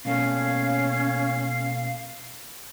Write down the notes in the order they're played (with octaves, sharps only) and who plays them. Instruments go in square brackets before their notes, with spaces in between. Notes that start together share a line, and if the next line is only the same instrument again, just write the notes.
[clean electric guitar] B2 A3 A#3 [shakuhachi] C#4 [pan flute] F5